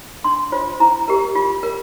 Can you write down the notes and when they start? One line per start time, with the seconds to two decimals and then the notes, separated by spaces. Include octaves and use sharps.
0.24 D4 C6
0.52 F4 C5
0.80 E4 A#5
1.08 G4 A#4
1.35 F4
1.63 A#4